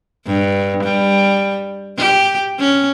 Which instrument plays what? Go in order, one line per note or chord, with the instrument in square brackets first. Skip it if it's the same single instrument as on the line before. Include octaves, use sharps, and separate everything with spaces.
[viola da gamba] G2
G3
G4
C#4